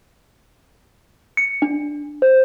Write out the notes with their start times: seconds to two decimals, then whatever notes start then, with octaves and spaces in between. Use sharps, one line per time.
1.37 C#7
1.62 D4
2.22 C5